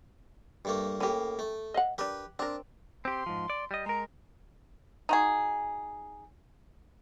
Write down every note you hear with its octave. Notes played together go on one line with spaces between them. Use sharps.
G2 A3 A#3
A2 A#3 C#4 G4
A3
D#5 F5 F#5
D4 G4 A#4 B4
C4 D4 A#4
C4 G4 C6
G#2 F3
D5
G3 D#5
G#3 A#4 A#5
D#4 F#4 G#4